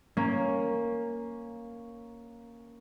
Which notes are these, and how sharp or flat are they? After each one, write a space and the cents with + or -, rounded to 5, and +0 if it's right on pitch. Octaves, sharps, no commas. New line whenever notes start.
A#3 +0 C#4 +0